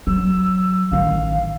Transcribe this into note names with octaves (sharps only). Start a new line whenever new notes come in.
F#3 E6
A1 D#3 F5